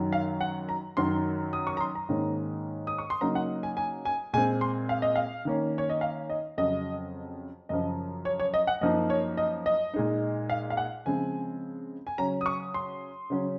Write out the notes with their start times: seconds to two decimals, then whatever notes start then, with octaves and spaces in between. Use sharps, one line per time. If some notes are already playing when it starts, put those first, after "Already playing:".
Already playing: F#2 D#3 F#3
0.13 F5
0.41 F#5
0.69 A#5
0.97 F#2 D#3 F#3 C6
1.53 D#6
1.67 C#6
1.77 A#5
1.81 C6
1.95 A#5
2.09 G#2 D#3 A#3 C#4
2.87 D#6
2.98 C#6
3.10 C6
3.21 C#3 F#3 A#3 D#4 A#5
3.35 F#5
3.63 G#5
3.77 G#5
4.05 G#5
4.33 A#2 G#3 C4 G#5
4.61 C6
4.89 F5
5.02 D#5
5.16 F5
5.45 D#3 A#3 C#4
5.78 C#5
5.89 D#5
6.01 F5
6.30 D#5
6.58 F2 C#3 F#3 D#5
7.69 F#2 C#3 F3 D#5
8.25 C#5
8.40 C#5
8.54 D#5
8.67 F#5
8.81 F#2 F3 A#3 D#4 D#5
9.10 C#5
9.37 D#5
9.66 D#5
9.94 A#2 G#3 D#4
10.50 F5
10.70 F5
10.77 F#5
11.06 C#3 F3 G#3 C4 G#5
12.07 G#5
12.18 C#3 F#3 C#4 A#5
12.41 D#6
12.46 C#6
12.74 C6
13.30 C#3 F#3 C#4